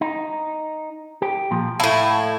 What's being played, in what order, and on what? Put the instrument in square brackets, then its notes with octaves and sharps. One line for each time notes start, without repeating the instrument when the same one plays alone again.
[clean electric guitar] D#4
G4
A#2 F3
[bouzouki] A2 E4 [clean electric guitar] F5 A5